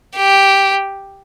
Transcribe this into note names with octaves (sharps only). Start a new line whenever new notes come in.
G4